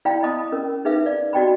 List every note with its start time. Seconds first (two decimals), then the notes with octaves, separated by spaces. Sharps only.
0.05 E4 D5 F5 G5 B5
0.23 D#5 A5 B5 D#6
0.52 C#4 A#4
0.85 D#4 G#4 B4 E5 F5
1.06 D5 F5
1.33 F#4 D5 D#5 G5 A5 B5